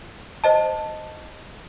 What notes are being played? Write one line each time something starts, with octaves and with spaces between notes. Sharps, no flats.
C5 D#5 A5